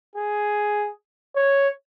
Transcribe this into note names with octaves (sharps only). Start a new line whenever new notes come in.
G#4
C#5